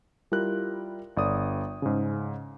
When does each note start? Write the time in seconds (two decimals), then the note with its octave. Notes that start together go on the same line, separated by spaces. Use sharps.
0.32 G3 E4 F4 A#4 F#6
1.17 G1 D5 D#6
1.82 G#2 C#3